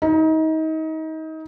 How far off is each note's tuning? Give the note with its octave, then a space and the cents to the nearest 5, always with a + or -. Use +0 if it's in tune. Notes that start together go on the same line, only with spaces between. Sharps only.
D#4 +30